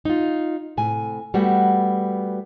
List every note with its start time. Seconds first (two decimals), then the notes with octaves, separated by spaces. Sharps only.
0.05 D#4 F4
0.77 A2 C3 G#5
1.34 G3 A3 B3 F#4 F#5